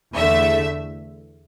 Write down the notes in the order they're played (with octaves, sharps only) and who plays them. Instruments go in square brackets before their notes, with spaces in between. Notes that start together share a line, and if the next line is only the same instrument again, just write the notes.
[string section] E2 D3 A3 E5